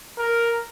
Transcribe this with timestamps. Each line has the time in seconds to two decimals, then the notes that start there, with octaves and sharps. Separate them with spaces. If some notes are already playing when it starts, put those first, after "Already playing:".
0.18 A#4